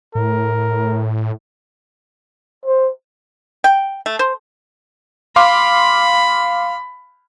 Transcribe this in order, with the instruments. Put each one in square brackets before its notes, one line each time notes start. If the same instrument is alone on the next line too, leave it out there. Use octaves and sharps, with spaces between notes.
[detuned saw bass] A2 [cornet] A#4
[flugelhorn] C5
[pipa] G5
A3
C5
[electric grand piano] F5 C6 D6 [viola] B5